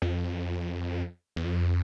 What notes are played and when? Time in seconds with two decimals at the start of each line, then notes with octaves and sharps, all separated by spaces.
0.02 F2
1.36 E2
1.45 F2